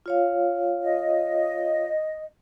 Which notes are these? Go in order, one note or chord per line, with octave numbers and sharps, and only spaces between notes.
F4 C#5 F5
D#5